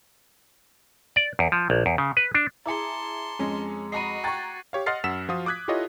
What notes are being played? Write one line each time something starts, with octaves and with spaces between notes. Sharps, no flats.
D5
E2
F3
A#1
E2
C#3
B4
D4
E4 G#4 A5 A#5 C6 D6 C#7
F2 G#3 C#4
F#4 D#5 A#5 B5 C7 D#7
G5 A#5 C#6 F#6 G#6 A6
G4 C#5 F5
D#5 F#5 C6 F6 A6 C7
F#2 F#5 E6 B6 E7
F3 F4 F#4 F5 D#6
D6 D#6 F#6 G#6 B6
E4 F4 G4 A4 C#5 D#5